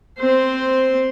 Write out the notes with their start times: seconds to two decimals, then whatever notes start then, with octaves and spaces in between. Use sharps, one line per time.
0.19 C4 C5